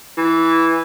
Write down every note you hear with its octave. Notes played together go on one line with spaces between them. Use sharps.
E3